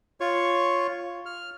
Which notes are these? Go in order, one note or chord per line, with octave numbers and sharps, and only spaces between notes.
F4 C#5 C#6
F6